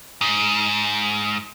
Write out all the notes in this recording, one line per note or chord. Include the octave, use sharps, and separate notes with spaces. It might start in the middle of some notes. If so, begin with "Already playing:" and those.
G#2